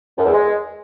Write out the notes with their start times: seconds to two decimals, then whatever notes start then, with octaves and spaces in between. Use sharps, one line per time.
0.18 F#2
0.26 E2
0.33 G#3